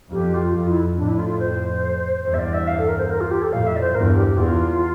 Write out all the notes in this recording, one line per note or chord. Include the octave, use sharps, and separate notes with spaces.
F2 G4
F4
F2 F4
E4
F2 A2 D4
E4
F4
F4
C5
E2 G2 C5
E5
D5
E5
F5
A4
A#4
C5
A#4
F4
G4
A4
F2 A2 F5
E5
D5
C5
E2 G2 A#4
G4
E2 F4